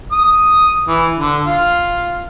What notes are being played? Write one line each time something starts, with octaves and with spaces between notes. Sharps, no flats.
D#6
E3
D3
F4